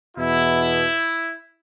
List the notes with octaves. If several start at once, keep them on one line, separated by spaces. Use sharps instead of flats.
E2 B2 B3 E4